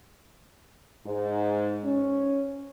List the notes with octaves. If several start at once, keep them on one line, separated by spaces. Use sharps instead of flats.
G#2
C#4